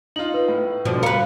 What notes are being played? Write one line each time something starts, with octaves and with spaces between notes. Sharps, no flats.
D#4 F4 F#7
B4
A2
B2 D3 F3
A#4 B4 F5 C#7